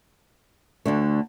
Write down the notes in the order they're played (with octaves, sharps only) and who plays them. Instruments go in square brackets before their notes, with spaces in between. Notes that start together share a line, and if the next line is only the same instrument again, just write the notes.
[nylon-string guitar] D2 D3 A3